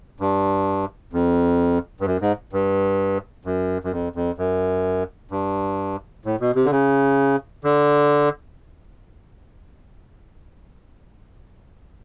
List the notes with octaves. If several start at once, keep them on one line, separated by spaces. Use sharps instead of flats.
G2
F2
G2
F#2
G#2
G2
F#2
F#2
F2
F2
F#2
G2
A2
B2
C3
D3
C#3
D3